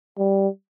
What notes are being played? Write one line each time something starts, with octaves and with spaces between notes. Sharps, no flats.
G3